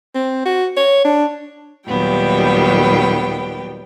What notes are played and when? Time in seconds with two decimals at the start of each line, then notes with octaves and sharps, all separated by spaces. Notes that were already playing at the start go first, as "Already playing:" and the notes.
0.15 C4
0.45 F#4
0.77 C#5
1.05 D4
1.87 D#2 A#2 F#3 G3 B3 G5